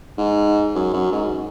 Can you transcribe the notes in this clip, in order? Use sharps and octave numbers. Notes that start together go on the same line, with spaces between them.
G#2
F#2
F#2
G#2